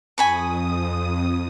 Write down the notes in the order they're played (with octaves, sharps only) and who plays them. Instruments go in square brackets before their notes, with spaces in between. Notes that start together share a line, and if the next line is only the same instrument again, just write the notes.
[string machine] F2 D#6 [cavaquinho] G#5 B5 C#6